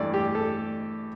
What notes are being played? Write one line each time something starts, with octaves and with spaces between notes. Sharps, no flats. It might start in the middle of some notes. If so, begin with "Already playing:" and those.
Already playing: G2 E3 A3 D5
G4
A4